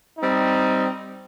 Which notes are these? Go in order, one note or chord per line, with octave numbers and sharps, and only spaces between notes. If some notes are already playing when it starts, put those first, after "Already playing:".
G3 C4 D#4